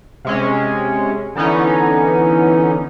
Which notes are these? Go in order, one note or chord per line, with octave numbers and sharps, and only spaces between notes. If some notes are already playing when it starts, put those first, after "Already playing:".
C3 G#3 C#4
D3 E3 B3 C#4 D#4